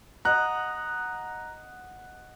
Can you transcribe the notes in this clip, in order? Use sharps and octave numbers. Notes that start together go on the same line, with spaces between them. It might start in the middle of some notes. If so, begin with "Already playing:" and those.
D#5 F#5 A#5 F#6